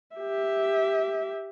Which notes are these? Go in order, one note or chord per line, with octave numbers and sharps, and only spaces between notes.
G4 E5